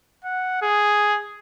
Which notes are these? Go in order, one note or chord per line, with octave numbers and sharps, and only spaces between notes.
F#5
G#4